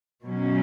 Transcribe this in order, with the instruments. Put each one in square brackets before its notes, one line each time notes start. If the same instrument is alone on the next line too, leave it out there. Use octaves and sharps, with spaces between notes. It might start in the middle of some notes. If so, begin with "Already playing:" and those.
[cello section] B2 F#3 C#4